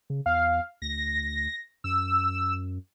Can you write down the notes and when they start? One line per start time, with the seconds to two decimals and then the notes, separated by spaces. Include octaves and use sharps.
0.10 C#3
0.26 E2 F5
0.82 D2 A#6
1.84 F#2 E6